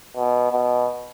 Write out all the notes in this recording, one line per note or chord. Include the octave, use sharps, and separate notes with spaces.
B2
B2